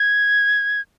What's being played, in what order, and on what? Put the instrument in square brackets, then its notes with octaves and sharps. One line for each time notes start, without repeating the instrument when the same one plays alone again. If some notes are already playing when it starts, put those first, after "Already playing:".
Already playing: [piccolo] G#6